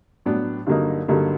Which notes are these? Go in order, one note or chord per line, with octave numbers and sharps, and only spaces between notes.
A2 F#3 B3 D4
G2 D3 F#3 A#3 D#4
G2 D3 F#3 A#3 D#4